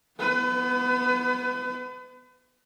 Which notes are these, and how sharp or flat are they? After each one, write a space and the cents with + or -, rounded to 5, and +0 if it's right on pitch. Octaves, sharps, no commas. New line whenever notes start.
B3 +0 B4 +35